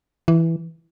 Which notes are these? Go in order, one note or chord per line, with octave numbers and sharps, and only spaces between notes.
E3